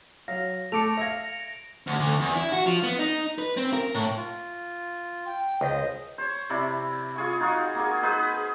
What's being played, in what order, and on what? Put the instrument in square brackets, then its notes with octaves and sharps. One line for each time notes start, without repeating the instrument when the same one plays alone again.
[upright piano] F#3 [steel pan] F5 [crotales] A#6
[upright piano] A3 D6 [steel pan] A4 A5 [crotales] C#7 D7 F7
[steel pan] E5 F5 [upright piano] G#6 A#6
[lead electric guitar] D2
D2
E2
E4
F#4
F3
B3
D#4
B4
C4
A#4
A2
[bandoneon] F4
[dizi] G5
[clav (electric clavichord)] C#2 [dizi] C5 [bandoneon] D#5
[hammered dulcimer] C5 C#5
C3 E4 D5 B5
F4 G#4 C#6
D#4 F4 F#4
A#3 G#4
D#4 G#4 B4 C5